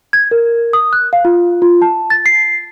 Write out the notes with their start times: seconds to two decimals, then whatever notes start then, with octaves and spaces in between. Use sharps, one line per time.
0.13 G#6
0.31 A#4
0.73 D#6
0.93 F#6
1.13 F5
1.25 F4
1.62 F4
1.82 A5
2.10 A6
2.26 C7